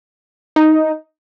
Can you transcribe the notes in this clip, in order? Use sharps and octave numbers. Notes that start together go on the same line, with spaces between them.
D#4